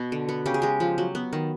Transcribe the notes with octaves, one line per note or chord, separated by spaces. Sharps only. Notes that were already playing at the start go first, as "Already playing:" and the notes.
Already playing: B2 B3
D3
B3
C#3 G4
G#4
G#3 G4
F3
F#3
B3
D#3